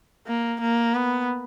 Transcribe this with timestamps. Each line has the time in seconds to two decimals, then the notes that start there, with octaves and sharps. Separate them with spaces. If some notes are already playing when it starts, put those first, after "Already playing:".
0.27 A#3
0.61 A#3
0.94 B3